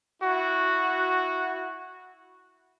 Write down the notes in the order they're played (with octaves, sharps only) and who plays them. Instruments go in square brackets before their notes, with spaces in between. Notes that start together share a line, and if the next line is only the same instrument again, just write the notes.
[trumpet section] E4 F#4